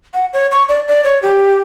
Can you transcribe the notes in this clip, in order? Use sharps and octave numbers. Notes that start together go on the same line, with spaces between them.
F#5
C#5
C#6
D5
D5
C#5
G4